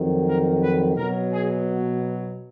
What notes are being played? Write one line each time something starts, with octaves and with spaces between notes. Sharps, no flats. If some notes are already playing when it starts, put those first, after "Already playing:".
Already playing: F2 D#3 F#3
A#4
B4
B2 F#3 A#4
G#4